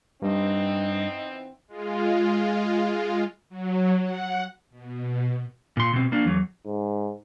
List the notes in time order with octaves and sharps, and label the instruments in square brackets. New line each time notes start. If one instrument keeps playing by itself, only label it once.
[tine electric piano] G2 [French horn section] E3 B3 C4 [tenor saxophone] D#4
[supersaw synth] G#3 F4
[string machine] F#3
F#5
B2
[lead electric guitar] A#2 C6
B2 C4
A#3 D4
E2 F#3
[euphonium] G#2